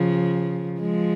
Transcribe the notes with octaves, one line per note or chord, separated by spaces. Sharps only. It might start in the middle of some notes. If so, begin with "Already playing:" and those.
Already playing: C#3 F3
F3 G#3